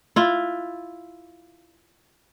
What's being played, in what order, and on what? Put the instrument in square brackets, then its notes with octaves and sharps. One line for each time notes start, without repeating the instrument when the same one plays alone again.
[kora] E4 F4